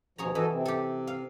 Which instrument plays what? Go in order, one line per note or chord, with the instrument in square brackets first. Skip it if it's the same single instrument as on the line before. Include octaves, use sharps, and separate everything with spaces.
[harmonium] D#2 B2 F3 [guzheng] G#4 C#5 A#5
[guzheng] E3 [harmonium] F#4 A4 D#5
[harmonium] C3
[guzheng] G4 A4
F5